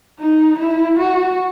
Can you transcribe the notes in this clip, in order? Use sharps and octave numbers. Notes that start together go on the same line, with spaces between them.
D#4
E4
F#4